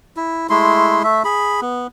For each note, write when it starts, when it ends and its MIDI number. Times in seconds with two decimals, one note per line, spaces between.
0.17 0.47 64
0.50 1.03 56
0.50 1.03 57
0.50 1.03 64
0.50 1.03 84
1.03 1.23 57
1.03 1.23 76
1.24 1.61 68
1.24 1.61 83
1.62 1.87 59